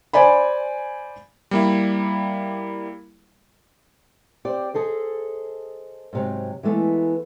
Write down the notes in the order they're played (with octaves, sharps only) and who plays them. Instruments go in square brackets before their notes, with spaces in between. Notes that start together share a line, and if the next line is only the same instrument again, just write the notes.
[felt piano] C5 D5 G#5 B5
[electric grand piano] G3 A#3 E4
[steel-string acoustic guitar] C4 G4 C5 D5
G#4 A4 C5 D#5
G#2 C3 F#3
E3 G#3 A3 B3